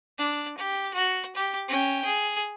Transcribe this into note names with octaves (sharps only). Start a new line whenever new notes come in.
D4
G4
F#4
G4
C#4 G5
G#4